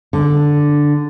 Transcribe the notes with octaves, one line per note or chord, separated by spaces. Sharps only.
D3